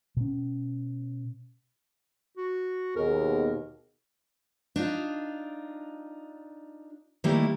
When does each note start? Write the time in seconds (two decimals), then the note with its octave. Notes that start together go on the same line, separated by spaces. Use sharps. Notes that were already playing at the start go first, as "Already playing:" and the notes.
0.17 B2 C#4
2.37 F#4
2.96 D#2 B2 G#4 A#4
4.76 D4 D#4 F4
7.24 D#3 G3 A3 A#3 E4